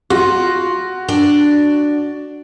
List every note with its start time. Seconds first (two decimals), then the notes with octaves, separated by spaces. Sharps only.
0.10 F4 F#4
1.08 D4 D5